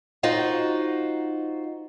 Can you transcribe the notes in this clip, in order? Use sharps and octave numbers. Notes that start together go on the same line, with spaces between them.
D#4 F4 F#4 C5